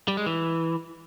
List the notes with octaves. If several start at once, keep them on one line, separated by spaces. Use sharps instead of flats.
G3
G#3
E3